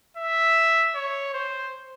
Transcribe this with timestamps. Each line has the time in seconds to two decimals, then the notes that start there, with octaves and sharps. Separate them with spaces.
0.17 E5
0.95 C#5
1.34 C5